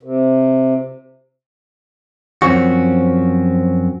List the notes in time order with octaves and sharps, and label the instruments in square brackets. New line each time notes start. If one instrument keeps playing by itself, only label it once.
[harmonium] C3
[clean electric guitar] F#2 F3 C4 C#4 F#4